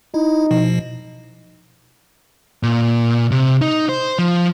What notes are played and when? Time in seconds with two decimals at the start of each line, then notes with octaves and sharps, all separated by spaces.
0.14 D#4 E4
0.51 B2 F3
2.63 A#2
3.31 C3
3.62 D#4
3.89 C5
4.19 F3